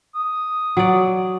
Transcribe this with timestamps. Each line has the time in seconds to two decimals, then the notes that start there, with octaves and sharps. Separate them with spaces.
0.16 D#6
0.77 F#3 D5